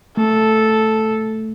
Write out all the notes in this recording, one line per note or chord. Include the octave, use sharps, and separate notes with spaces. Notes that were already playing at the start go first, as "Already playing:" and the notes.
A3 A4